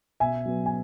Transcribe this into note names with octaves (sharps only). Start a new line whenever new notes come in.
B2 E5 G#5
F#3 B3
G#5